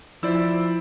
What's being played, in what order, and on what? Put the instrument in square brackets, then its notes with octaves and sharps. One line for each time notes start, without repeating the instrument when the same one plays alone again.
[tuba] F3 [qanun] E4 [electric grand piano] C5 D5 E6